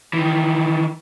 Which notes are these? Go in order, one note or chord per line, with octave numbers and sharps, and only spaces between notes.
D#3 E3